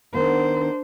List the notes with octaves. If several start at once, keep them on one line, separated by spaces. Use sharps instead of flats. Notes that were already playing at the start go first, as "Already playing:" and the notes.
D#3 B3 D4 C5